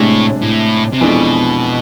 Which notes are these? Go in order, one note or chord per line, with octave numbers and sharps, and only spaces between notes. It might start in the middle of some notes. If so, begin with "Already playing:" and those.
Already playing: A2 C3 G#3 D4
A2
C3
F2 B2 E3 G#3 D4